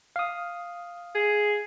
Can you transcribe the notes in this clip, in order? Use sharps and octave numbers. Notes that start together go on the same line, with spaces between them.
F5 D#6
G#4